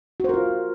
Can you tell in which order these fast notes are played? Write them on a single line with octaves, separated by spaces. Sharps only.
F#4 C5 A#4 F4